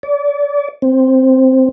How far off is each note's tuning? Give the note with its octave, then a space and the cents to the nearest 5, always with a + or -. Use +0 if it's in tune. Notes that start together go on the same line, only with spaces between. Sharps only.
D5 -35
C4 +0